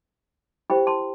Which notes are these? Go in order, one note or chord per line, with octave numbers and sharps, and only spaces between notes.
E4 G4 C5 G5 B5
A5 C6